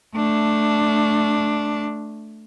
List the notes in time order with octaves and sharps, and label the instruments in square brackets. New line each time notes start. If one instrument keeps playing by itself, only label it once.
[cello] A3 D4